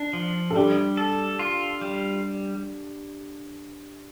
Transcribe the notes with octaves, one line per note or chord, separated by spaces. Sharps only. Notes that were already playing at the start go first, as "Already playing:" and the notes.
Already playing: D4
F3
A4
G3 D4 G4
A4
F4
G3